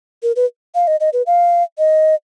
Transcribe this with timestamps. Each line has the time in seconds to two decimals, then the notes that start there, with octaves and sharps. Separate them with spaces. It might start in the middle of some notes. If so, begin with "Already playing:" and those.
0.23 A#4
0.36 B4
0.75 F5
0.87 D#5
1.00 D#5
1.13 B4
1.26 F5
1.78 D#5